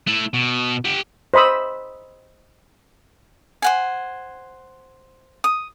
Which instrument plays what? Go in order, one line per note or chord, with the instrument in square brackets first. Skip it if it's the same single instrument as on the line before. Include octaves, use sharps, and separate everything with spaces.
[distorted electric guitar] A3 E4
B2
G4 F#5
[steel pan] C5 D#5 B5 D#6 E6
[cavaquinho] C5 F#5 G#5
D#6